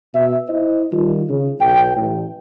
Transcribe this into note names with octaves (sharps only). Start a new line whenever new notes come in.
B2 E5
E4 C5 D#5
D#3 G3 F4
C#3
B1 G5
A1